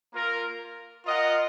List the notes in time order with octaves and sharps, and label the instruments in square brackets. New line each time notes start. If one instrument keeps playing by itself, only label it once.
[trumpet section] A#3 F4 A#4
F4 A#4 D#5 F#5